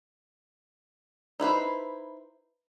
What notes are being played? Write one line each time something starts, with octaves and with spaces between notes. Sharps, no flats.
D#4 E4 B4 C5